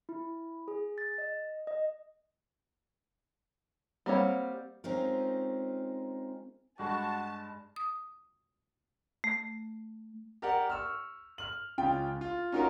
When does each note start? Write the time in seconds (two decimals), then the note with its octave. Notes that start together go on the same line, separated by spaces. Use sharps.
0.09 E4
0.68 G#4
0.98 A6
1.18 D#5
1.67 D#5
4.06 G3 A#3 C4 C#5 F#5
4.84 G#3 C4 C#4 D#4 F4 A#4
6.79 G2 G#3 F#4 A5
7.76 D#6
9.24 A3
10.42 G4 A#4 D5 F#5
10.70 C#6 E6 F6
11.38 F6 F#7
11.78 C#2 C#3 F4 G5
12.21 F4
12.52 C#4 D#4 F4 F#4 A#4